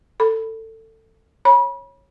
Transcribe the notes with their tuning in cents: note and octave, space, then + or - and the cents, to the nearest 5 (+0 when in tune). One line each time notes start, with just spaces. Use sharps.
A4 +20 B5 +0
C#5 -15 B5 -35